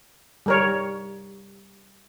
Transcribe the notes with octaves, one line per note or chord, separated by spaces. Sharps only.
G3 A#4 C#5